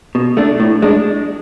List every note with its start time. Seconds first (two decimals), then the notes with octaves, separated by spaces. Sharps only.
0.15 B2
0.37 A3 D4
0.60 A2
0.82 G#3 D4